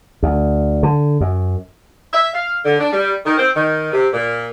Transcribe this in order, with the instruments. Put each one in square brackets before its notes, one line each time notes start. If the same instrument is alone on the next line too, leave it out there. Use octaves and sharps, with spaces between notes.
[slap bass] D2
D3
F#2
[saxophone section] E5
F5
D3
D4
G3
D#3
C4
D#3
C3
A#2